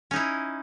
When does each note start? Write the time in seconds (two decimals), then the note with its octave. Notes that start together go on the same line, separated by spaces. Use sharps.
0.11 C#4
0.13 D#4
0.16 E4